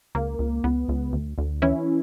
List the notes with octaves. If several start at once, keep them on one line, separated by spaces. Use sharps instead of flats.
C#2 A#3
C#2
C#2 B3
C#2
D2
D2
E3 C#4 E4